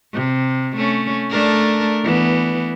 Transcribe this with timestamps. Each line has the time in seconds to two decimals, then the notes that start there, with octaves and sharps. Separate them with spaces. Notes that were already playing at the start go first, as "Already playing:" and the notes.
0.13 C3
0.76 A3 C#4
1.30 A3 D4 A#4
2.03 E3 B3